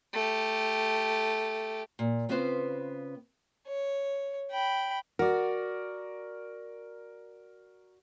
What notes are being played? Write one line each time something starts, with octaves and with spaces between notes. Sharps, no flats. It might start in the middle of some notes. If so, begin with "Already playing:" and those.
A3 G4
A#2
C#3 B3 C4 F4 B4 C5
C#5
G5 B5
F#4 A#4 D5